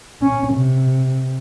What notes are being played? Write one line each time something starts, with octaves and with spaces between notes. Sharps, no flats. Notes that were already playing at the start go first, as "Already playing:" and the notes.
C#4
C3